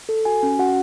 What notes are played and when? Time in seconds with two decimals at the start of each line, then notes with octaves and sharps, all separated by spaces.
0.09 A4
0.25 F#4 G#5
0.43 C#4
0.59 F#4 F#5